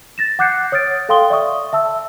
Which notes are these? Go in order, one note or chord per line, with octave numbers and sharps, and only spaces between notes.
A6 A#6 E7
F#5 D6 F#6 G6 C7 C#7
C#5 D#6 F6 A6 D7
A4 F5 G5 C6 D#6 G7
D5 E5 C#6 D#6
E5 A5 E6